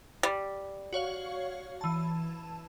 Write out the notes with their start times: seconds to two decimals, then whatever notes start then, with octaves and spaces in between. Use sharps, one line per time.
0.23 G3
0.93 F#4 C#5 F5
1.81 E3 A5